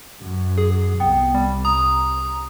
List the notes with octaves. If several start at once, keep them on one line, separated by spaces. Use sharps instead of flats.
F#2
G#4
C2 B3 G5
G3
A#5 D#6